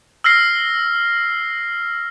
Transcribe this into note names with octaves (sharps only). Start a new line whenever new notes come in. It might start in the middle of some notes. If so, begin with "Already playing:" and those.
E6 F6 A#6 C7